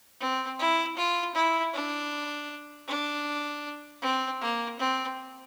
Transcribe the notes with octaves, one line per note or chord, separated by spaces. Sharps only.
C4
E4
F4
E4
D4
D4
C4
A#3
C4